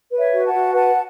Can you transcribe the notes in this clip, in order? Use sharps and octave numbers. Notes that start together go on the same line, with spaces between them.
B4
C#5 E5
F#4
F#5 A5
F#4
B4 F#5 A5